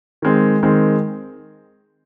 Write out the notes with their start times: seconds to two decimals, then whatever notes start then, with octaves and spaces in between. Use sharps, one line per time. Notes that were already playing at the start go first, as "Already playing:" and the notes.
0.22 D#3 G#3 C4
0.63 D#3 G#3 C4